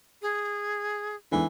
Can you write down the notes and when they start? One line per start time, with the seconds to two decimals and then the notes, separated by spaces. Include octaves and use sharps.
0.22 G#4
1.32 E2 G#2 D3 E3